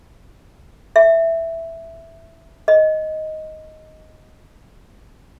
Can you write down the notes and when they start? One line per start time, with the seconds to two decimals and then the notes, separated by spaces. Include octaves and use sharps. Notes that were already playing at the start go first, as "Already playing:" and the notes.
0.96 E5
2.68 D#5